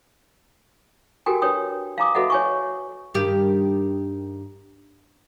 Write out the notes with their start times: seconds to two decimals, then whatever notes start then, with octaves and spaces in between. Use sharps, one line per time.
1.26 F#4 G4 A4 A#4 G5 G#5
1.42 D4 B4 C#5 G5 D#6
1.98 F5 G#5 A#5 D6 D#6
2.15 F#4 A4 B4 D#5 E5 F#5
2.30 C#5 G#5 C#6
3.14 G2 D#3 G4